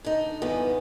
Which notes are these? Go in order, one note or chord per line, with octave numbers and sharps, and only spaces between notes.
D3 D#4
E2 G2 E3 B3